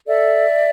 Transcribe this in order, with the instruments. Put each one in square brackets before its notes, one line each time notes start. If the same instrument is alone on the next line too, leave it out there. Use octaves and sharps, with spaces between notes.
[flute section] A4 D5 E5